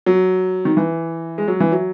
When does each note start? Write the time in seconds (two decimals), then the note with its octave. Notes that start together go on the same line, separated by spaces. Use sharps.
0.06 F#3
0.65 D#3
0.77 E3
1.38 G#3
1.48 F#3
1.60 E3
1.72 F#3